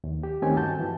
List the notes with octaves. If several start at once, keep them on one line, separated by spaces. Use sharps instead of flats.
D#2
G4
D#3 A3 C4 C#4 G4 G#5
G2 F#4 A5 G6
E3